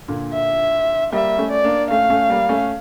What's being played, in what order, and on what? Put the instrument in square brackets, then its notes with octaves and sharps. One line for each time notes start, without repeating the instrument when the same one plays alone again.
[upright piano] A#2 D3
[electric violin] E5
[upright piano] G3 A#3 [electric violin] E5
[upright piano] A3 C#4
[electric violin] D5
[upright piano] A#3 D4
[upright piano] A3 C#4 [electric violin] F5
[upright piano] A3 C#4
G3 A#3
A3 C#4